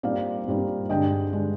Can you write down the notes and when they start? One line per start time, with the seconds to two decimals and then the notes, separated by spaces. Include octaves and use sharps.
0.03 A#2 G3 C4 D#4 D5 F5
0.48 A#2 G3 C4 D#4
0.89 G2 D3 G#3 D4 D#5 G5
1.33 D3 G#3 D4